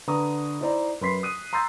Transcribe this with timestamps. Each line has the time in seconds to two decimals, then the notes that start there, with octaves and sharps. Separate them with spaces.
0.07 D3 B4 A#5 C#6 D#6
0.61 D#4 E4 C5 D5 A#5
1.01 F#2 B4 B5 C6 B6 C7
1.23 D#6 F#6 D#7
1.53 A#5 C6 E6 G6 A6